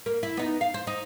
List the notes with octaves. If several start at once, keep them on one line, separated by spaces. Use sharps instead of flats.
A#3
E4
B3 D#4
F5
C5
D#4